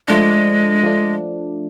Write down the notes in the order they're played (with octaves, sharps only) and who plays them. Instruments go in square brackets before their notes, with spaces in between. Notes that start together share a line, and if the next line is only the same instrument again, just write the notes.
[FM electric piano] F3 A3 D4 [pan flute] G#3
[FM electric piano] F3 A3 D4